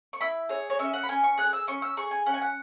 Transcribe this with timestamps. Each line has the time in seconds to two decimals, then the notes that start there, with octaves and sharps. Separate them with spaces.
0.13 C#6
0.21 E4 B5
0.49 G#4 C#5
0.70 C#5
0.79 C#4 E5
0.93 F#5
1.04 B5
1.09 C#4 G#5
1.24 C#6
1.38 G#4 F#6
1.53 E6
1.67 C#4 C#6
1.82 E6
1.97 G#4 C#6
2.11 G#5
2.26 C#4 F#5
2.34 G#5
2.42 F#5